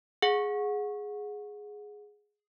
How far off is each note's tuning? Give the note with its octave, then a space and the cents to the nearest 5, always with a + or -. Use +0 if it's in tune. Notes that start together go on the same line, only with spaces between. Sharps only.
G#4 +5 F#5 -25